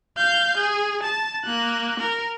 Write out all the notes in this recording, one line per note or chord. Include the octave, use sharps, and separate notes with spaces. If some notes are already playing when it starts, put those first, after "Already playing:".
F5 G6
G#4
A5
A#3 F#6
A#4